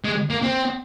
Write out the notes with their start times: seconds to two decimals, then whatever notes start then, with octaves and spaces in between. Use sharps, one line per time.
0.05 G#3
0.30 A#3
0.43 C4